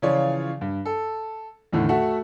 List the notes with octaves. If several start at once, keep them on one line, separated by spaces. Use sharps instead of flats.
C#3 E3 F3 F4 C#5 D5
G2
A4
E2 A2 D3 D#3
A3 F#4 A4 E5 F#5